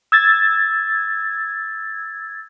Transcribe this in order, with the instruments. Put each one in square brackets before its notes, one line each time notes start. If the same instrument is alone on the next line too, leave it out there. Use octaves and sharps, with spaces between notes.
[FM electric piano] E6 G#6 A6